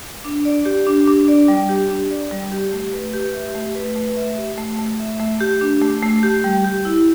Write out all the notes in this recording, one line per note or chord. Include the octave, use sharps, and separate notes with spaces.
D4
D5
G4
D4
D4
D5
G3
G4
D4
D5
G3
G4
A3
B4
G4
E5
A3
B4
A3
E5
G4
A3
A3
E5
A3
G4
D4
A3
A3
G4
G3
G4
E4